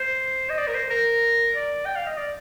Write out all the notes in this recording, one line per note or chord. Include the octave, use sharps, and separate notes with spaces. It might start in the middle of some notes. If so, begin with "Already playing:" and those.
Already playing: C5
D#5
D5
A#4
C5
A#4
D5
G5
F5
D#5
D5